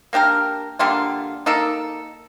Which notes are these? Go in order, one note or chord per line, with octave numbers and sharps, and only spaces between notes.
A#3 D4 G4 A#4
D3 G3 A#3 F4
A#3 D#4 A4